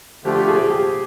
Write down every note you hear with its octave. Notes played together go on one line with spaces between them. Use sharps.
D3 F3 A3 G4
G4
G#4
G4